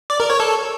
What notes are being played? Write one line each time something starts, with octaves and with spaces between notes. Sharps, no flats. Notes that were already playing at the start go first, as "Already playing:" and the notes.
D5
A#4
C#5
A4